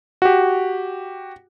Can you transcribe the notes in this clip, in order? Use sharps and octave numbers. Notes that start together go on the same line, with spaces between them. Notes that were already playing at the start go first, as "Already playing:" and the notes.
F#4 G4